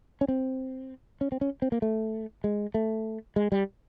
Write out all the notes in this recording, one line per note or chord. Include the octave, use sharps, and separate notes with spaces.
C#4
C4
C#4
C4
C#4
C4
A#3
A3
G#3
A3
G#3
G3